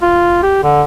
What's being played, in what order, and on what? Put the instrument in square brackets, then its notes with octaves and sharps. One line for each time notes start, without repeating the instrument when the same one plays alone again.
[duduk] F4
G4
D3